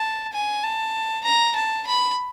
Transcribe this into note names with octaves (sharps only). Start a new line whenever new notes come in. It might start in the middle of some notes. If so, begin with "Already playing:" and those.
Already playing: A5
G#5
A5
A#5
A5
B5